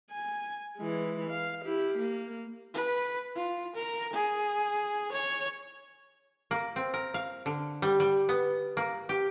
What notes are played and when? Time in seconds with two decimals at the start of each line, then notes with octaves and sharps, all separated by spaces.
0.12 G#5
0.77 E3 G#3
1.30 F5
1.65 E4 G4
1.98 A#3
2.74 B4
3.35 F4
3.76 A#4
4.13 G#4
5.12 C#5
6.51 A#3
6.76 C4
6.94 A#4
7.14 F5
7.46 D3
7.82 G3
8.00 G3
8.29 B3
8.77 A#3
9.09 G4